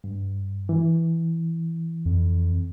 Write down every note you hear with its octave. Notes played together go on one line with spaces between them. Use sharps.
G2
E3
F2